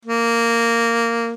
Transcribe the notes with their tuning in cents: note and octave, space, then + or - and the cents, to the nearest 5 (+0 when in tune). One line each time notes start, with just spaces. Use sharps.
A#3 -10